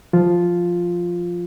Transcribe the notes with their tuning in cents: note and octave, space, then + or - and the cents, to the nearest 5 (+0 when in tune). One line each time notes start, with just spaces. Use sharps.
F3 +0 F4 +0